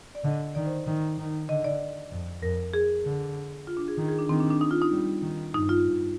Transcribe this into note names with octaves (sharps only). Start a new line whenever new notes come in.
D5
D3 D#5
D#3 D5
C5
D#3
D#3
D3 D#5
D5
F2
F2 A#4
G#4
D3
F4
D4
G#4
D#3
G#4
D4
D#3 C4
D4
D4
D#4
F4
D#4
G3
D#3
G2 D#4
F4
G2